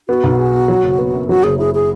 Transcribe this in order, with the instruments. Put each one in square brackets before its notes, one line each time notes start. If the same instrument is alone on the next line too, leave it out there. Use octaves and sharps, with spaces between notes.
[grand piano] B3 [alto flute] F#4
[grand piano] B1
G#4
B2
F#3
F#1
B3
F#2
[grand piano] F#3 [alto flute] F#4
[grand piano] F#1 [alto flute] G#4
[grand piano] E4 [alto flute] G#4
[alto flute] G#4